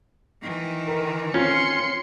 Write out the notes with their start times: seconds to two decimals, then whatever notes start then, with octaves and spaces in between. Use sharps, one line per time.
0.42 D#3 E3
0.87 A#4
1.34 C4 C#4 F4 C6 C#7